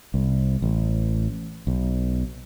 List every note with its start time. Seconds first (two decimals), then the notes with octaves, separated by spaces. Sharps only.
0.14 C2
0.62 A1
1.67 B1